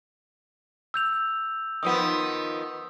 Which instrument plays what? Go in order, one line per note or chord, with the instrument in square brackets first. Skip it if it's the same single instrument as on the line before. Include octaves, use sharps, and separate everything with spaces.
[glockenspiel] E6 G6 F7
[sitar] D#3 F3 B3 [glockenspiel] D#6